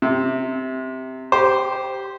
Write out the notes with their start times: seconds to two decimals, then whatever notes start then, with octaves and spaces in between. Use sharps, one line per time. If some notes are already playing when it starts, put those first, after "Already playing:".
0.02 C3
1.32 G4 C5